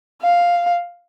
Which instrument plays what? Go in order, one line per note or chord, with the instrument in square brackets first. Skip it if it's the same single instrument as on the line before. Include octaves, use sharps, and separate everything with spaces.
[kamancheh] F5